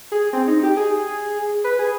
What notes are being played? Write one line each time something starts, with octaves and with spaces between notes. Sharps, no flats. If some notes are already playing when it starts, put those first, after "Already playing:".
G#4
C4
D#4
G4
G#4
B4
G#4